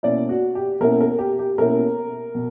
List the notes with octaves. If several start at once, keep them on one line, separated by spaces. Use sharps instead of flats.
B2 A#3 C#4 E4 D5
F#4
G4
B2 A#3 C#4 E4 A#4
A#4
G4
G4
B2 A#3 C#4 E4 A#4
B2